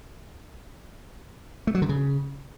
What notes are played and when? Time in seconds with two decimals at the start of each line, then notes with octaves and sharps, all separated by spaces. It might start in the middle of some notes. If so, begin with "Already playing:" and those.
1.67 A3
1.75 F#3
1.82 D3
1.89 C#3